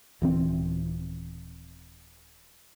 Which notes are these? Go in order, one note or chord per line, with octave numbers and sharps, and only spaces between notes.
D#1 E3 C4